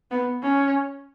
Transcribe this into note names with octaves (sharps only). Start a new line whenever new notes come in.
B3
C#4